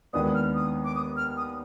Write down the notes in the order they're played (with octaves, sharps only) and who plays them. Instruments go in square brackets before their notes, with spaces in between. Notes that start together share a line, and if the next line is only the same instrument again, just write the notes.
[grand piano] D#2 D#3 G#3 B3 D4 [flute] D#6
[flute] F6
D#6
D6
D#6
F6
D#6